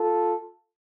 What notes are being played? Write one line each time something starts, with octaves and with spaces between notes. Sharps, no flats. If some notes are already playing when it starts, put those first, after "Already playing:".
Already playing: F4 A4